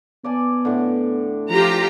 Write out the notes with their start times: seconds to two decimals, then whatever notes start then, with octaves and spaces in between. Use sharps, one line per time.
0.24 B3 D5 G#5 A5
0.65 A2 D3
1.50 F3 F4 G4 A#5